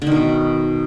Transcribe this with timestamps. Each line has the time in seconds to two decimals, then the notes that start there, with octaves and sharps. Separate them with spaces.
0.02 D3
0.07 D#3
0.12 B2